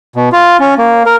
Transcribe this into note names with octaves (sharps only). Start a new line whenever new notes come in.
B2
F4
C#4
A#3
A#4